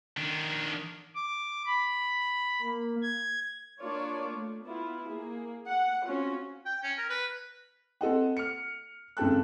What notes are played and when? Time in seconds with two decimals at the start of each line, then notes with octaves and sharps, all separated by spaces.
0.17 D#3 D4
1.15 D6
1.66 B5
2.62 A#3
3.03 G#6
3.81 A#3 D4 F4 C#5 D5
4.35 A3
4.67 B3 E4 F4
5.09 A#3 G#4
5.65 F#5
6.05 C4 C#4 F4 F#4
6.66 G5
6.83 C#4
6.98 A#4
7.10 B4
8.01 C4 A4 D#5 F#5
8.37 F6 C#7
9.17 G#1 C#3 A4 G5 A5 F#6